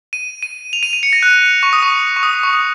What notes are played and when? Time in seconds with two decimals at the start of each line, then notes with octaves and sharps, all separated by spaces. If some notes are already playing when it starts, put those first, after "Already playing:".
0.13 D#7
0.43 D#7
0.73 F7
0.83 D#7
0.93 D#7
1.03 C#7
1.13 A#6
1.23 F#6
1.63 C#6
1.73 D#6
1.83 C#6
2.16 C#6
2.23 D#6
2.33 D#6
2.43 C#6
2.53 D#6